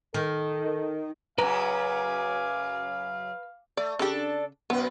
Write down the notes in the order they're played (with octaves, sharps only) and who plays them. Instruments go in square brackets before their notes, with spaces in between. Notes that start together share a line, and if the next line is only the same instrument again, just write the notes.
[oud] D#3 [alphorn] A4
[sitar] F#2 C#3 [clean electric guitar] B4 A#5 [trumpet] F5 [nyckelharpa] G#5 D6
[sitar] A3 [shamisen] D5
[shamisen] C#3 G4 [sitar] D4 A4
[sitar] F#2 B2 B4 [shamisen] B3